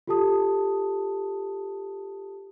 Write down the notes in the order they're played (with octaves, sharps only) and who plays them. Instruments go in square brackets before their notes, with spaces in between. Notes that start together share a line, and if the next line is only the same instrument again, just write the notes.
[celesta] F4 G4 A4 A5 D#6